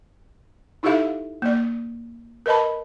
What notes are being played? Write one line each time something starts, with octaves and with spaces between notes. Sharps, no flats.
D#4 E4 G4 A4 E5 F5
A#3 D5
A#4 B4 D#5 A5 B5